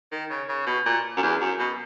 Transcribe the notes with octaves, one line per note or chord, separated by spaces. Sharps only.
D#3
C#3
C#3
B2
A#2
F#2
E2
F#2
B2